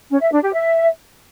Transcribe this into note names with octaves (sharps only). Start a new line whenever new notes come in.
C#4
E5
D4
G4
E5